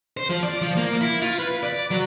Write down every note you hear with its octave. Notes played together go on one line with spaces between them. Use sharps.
C5
F3
D5
F3
A#3
E4
F4
B4
D5
F#3